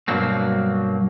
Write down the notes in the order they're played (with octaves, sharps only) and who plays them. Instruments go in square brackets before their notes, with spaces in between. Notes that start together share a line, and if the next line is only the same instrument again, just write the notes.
[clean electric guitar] G2 B2 F#3 A#3 C4